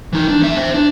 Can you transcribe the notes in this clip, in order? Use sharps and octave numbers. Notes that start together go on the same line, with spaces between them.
E3 D#4
D4
E2 E5
C5 E5
D4